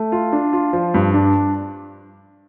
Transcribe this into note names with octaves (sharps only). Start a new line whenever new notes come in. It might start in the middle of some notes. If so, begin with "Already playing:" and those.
Already playing: A3
F4
D4
F4
F3
G2
D4